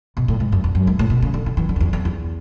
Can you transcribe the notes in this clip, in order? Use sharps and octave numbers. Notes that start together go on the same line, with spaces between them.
B2
A2
G#2
F#2
E2
F#2
G#2
A2
B2
C#3
D3
E3
E3
D3
F#2
E2
E2
E2